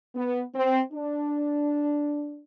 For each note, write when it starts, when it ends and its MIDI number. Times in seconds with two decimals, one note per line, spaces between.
0.15 0.41 59
0.54 0.81 60
0.93 2.40 62